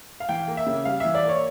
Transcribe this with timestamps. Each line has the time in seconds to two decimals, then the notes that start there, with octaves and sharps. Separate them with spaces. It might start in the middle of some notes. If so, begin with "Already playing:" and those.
0.20 F5
0.29 E3 G5
0.48 A#3
0.57 E5
0.67 C#3
0.85 G3 F5
1.00 E3 E5
1.15 D5
1.24 A#3 C#5